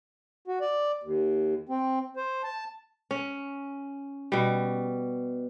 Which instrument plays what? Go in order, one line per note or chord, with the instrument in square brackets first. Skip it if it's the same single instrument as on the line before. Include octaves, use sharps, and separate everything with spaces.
[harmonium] F#4
D5
D#2
C4
C5
A5
[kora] C#4
B2 G3